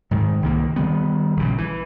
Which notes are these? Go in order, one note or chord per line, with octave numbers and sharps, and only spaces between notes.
G#2 D#3
C2 D#3 A#3
D#3 F3 G3 B3
A#1 C#3
E3